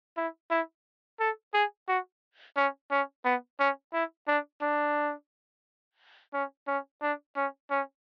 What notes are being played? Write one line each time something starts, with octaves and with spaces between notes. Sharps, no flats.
E4
E4
A4
G#4
F#4
C#4
C#4
B3
C#4
E4
D4
D4
C#4
C#4
D4
C#4
C#4